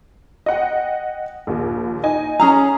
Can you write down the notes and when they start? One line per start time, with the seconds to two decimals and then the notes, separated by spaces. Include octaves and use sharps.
0.46 D#5 F#5 G5
1.47 A#1 D#2
2.03 D#4 D#5 G#5
2.39 C#4 G#4 A#5